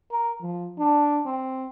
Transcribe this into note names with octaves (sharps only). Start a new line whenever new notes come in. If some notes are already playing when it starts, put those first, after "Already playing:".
A#4
F3
D4
C4